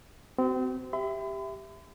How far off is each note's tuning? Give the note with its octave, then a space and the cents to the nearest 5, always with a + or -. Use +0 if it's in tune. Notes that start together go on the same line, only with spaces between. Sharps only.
C4 -30 F#4 +35
G4 +5 E5 +0 B5 +45